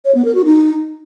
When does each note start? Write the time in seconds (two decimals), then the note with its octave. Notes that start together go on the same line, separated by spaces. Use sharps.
0.05 C#5
0.15 B3
0.25 A#4
0.35 F#4
0.45 D#4